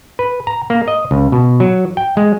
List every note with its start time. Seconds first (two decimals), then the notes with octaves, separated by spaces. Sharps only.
0.19 B4
0.47 A#5
0.70 A#3
0.88 D#5
1.11 C#2
1.32 B2
1.60 F#3
1.97 G5
2.17 G#3